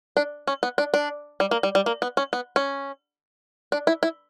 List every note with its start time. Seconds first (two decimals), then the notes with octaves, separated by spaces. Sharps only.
0.17 D4
0.47 C#4
0.63 B3
0.78 D4
0.94 D4
1.40 G3
1.51 A#3
1.63 G3
1.75 G3
1.86 A#3
2.02 B3
2.17 C#4
2.33 B3
2.56 C#4
3.72 D4
3.87 E4
4.03 E4